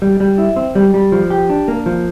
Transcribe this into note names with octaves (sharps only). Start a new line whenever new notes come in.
G3
G3
E4
C4
G3
G3
F3
G4
D4
A#3
F3